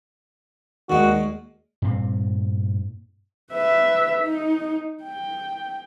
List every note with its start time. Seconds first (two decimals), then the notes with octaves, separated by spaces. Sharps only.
0.90 D#2 A#2 D#3 G#3 F#4
1.82 G2 A#2 C4
3.52 B4 E5
4.21 D#4
5.03 G5